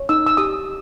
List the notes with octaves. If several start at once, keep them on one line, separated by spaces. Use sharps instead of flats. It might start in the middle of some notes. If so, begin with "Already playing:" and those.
Already playing: C#5
D#4 E6
E6
G4 D#6